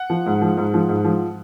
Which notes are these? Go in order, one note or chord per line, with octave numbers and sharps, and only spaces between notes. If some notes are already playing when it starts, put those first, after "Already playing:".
Already playing: F#5
F3
G#2
F3
G#2
F3
G#2
F3